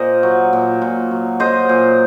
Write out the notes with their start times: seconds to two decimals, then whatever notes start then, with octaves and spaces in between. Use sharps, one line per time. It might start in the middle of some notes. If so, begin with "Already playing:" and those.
Already playing: A#2 A#4 C5 D#5
0.23 F#3
0.53 A#2
0.82 A#2
1.11 F#3
1.40 F#3 C5 D#5
1.69 A#2